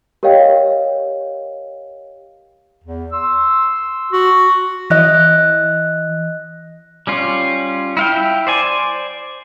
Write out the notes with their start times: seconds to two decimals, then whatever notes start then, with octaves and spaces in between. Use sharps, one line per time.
0.23 G4 A#4 C#5 D#5 F5 G5
2.84 E2
3.12 C6 E6
4.12 F#4
4.90 E3 D#5 F#6 A#6
7.07 G3 C#4 F4
7.97 E4 F5 G5
8.47 C5 D5 G#5